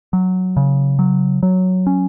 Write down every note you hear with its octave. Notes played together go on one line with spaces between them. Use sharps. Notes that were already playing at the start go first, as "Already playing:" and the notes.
F#3
C#3
F#3
F#3
C#4